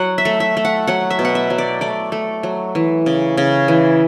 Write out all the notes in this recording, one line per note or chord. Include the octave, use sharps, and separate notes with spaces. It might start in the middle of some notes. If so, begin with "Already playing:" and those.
Already playing: F#3 F#5
E5
A3
E5
A3
F#5
F#3 F#5
E5
B2
F#5
E5
F#3
D5
A3 D5
A3
F#3
E3
C#3
C#3
E3